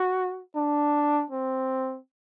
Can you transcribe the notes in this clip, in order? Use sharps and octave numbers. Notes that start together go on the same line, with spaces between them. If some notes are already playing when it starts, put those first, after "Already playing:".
Already playing: F#4
D4
C4